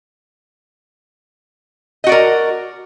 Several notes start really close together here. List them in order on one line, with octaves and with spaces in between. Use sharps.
D#5 F#4 D5 A#4